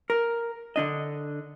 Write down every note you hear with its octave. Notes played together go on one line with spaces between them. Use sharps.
A#4
D3 D4 D#5